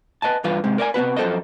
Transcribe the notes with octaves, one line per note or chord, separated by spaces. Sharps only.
B4 D#5 G#5 A5
G2 E3 F4 B4 F5
G#2 C3 G#3
A#4 D5 D#5 G#5
C3 B3 F#4 B4
F#2 F3 A4 C5 D#5